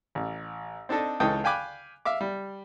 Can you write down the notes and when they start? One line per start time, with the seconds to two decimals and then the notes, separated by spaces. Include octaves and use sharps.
0.15 A1
0.89 C4 D4 D#4 A4 D#5
1.20 C#2 E3 D#4 A4 G5 D#6
1.44 F5 G5 G#5 B5 D6 F#6
2.05 E5 F5 D6
2.21 G3